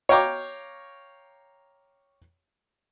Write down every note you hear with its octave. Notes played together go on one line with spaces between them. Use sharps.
C#5 F5 G5 A#5 C#6 D6